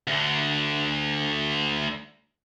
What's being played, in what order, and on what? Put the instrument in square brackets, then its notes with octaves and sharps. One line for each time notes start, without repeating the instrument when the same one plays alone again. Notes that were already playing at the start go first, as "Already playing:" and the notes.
[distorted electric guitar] D2 D3